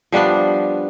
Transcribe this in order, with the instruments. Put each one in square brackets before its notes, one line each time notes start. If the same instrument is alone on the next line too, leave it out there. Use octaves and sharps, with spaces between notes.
[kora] F3 G3 B3 D4